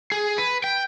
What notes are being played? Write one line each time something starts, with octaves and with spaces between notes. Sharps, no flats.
G#4
B4
G5